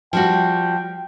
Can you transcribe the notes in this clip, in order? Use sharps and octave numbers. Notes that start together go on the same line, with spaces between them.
F3 G3 F#4 G5